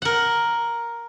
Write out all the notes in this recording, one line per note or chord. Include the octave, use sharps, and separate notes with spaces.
A#4 F#5